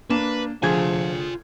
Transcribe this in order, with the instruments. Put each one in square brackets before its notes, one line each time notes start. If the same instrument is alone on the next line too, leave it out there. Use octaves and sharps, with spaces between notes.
[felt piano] A#3 D4 E7 [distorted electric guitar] B4
[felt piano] D2 G#4 G#6 [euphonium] F3 [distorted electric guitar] F4 G#5